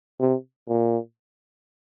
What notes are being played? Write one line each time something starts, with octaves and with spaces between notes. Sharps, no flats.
C3
A#2